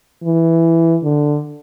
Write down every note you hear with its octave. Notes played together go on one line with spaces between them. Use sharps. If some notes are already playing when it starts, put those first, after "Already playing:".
E3
D3